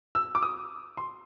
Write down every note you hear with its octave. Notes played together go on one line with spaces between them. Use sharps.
E6
D6
D#6
C6